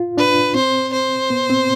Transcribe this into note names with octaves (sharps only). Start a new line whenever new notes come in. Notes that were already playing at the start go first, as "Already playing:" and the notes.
Already playing: F4
D4 B4
C4 C5
C5
B3
C4